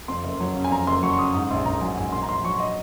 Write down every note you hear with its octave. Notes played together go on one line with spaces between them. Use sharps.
F2 C6
F#1
F#3
C#3
G#5
F2 A#5
F#1 C6
F#3 C#6
C#6
C#3 D#6
G#2 D#6
A#1 C6
A#1 A#5
F#3 G#5
G#2 G#5
A#1 C6
A#5
A#1 C6
F#3 C#6
D#5